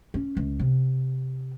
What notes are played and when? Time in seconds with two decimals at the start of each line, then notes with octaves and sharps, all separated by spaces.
0.14 C#4
0.37 C#2
0.59 C3